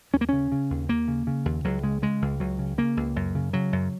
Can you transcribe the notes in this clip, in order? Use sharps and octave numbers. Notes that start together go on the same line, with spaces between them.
D#2 C#4
A#3
C#3 C#4
C#3
D#2
D#2 A#3
C#3
C#3
D#2
C#2 F#3
C#3 G#3
C#3 G#3
C#2
C#2 F#3
C#3
C#3 A#3
C#2
F#2
C#3
C#3 F#3
F#2